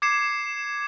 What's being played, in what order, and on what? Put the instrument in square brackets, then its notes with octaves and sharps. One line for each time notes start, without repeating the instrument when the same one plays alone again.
[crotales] D6 G#6 C7 C#7 E7